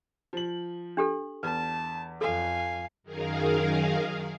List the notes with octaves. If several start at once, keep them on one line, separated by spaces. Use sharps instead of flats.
F3 F#7
D4 G4 A4
E2 B4 A5
F2 A4 F5 G#5
F#2 D#3 G#4 A#4 F5